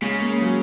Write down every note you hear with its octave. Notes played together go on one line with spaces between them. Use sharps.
C#3 G#3
A#3
F#3